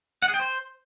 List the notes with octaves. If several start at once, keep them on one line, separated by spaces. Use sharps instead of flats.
F#5
G#4
G5
C5